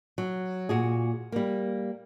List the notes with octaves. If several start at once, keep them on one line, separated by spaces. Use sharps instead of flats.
F#3
A#2 F#4 G#4
G3 A#3